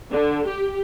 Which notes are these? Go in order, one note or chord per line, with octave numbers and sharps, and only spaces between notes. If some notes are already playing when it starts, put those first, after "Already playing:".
D3
G4